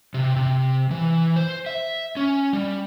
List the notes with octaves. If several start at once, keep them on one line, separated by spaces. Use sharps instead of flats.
C3
C3
E3
C5
E5
C#4
G3